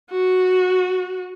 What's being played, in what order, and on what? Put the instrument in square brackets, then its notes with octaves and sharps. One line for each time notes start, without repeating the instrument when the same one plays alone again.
[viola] F#4